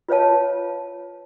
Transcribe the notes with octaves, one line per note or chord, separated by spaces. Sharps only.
F4 B4 C#5 F5 A5